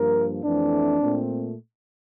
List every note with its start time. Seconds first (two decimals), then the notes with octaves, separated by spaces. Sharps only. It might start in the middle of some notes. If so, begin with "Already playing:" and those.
Already playing: G2 F3 A#3 A#4
0.43 F2 E3 A3 C4 D4
0.98 A#2 A3 C4